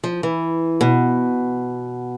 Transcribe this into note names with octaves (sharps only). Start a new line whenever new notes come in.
F3
E3
B2